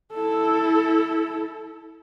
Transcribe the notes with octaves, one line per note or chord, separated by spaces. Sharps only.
E4 A4